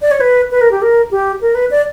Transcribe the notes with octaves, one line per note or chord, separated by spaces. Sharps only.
D5
C#5
B4
B4
A#4
G4
A#4
G4
A#4
B4
D5